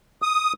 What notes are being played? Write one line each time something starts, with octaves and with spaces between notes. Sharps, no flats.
D#6